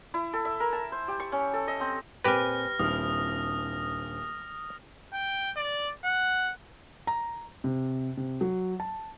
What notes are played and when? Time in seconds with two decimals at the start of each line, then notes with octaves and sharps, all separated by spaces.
0.14 E4
0.33 A4
0.45 E5
0.60 A#4
0.73 A5
0.92 C5
1.08 G4
1.20 C#6
1.32 C#4
1.53 A4
1.68 D#5
1.81 C4
2.24 A#2 C4 G4 B4 G#5 F6 A#6
2.79 D#1 C4 D4 E4 D#6 F6
5.14 G5
5.56 D5
6.05 F#5
7.07 A#5
7.64 C3
8.17 C3
8.41 F#3
8.80 A5